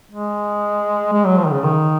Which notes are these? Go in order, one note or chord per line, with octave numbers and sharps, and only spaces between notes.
G#3
G#3
F#3
F3
D#3
C#3
D#3